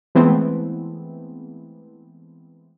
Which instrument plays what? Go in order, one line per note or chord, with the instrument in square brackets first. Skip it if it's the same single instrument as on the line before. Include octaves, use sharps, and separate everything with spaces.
[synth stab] E3 G#3 A3 B3 C4